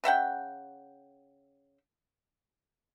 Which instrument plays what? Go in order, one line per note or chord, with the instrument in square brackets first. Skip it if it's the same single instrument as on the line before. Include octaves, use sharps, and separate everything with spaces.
[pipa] C#3 E5 F#5 G5